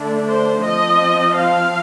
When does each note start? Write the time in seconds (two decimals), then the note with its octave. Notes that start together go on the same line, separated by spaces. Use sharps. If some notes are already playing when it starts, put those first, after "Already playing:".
Already playing: D3 A3 D4
0.28 C5
0.63 F3 C4 D#5
1.36 F5